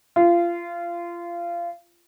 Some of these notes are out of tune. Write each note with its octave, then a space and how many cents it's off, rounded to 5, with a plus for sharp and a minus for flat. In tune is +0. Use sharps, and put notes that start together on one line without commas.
F4 -25